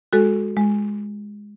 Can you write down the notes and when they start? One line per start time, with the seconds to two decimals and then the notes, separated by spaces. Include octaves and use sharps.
0.13 G#3 F#4 A4
0.56 G#3